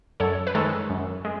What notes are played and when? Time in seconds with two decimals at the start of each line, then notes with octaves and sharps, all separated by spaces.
0.20 F#2 A4 C#5
0.47 B4
0.55 D#3 G#3 A4 C#5
0.90 F#2
1.25 G#3